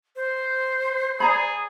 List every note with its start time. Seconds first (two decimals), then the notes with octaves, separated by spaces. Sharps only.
0.16 C5
1.20 G#4 D5 A#5 B5